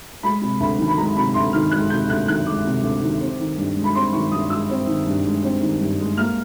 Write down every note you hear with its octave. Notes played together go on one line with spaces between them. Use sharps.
G#3 B5
C3
D2 B5
D#3
B5
G#3 A#5
C3 B5
D2 C6
D#3 F6
G#3 F#6
C3 G6
D2 F#6
D#3 F#6
G#3 D6
C3
D2
D#3
C4
D#3
G2
G#3
B5
C4 C6
D#3 C#6
G2 D#6
G#3 E6
C4
D#3
G2
G#3
C4
D#3
G2
G#3
A#3 F6